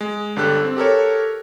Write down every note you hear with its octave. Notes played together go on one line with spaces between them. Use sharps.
G#3
G1 D3 G4 A4 F#6
C4
G4 A4 A#4 C#5